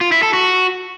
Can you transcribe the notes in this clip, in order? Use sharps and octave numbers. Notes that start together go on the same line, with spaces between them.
F4
E4
A4
F#4